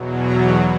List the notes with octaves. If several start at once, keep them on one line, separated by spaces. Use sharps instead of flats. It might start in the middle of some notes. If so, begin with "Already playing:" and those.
Already playing: E2 B2 F#3
A#5